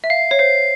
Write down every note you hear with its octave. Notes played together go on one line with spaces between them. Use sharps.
E5
F5 C7
C#5
C5 C7